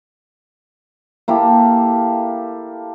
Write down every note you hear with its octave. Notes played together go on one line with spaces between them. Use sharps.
A#3 E4 G4 A4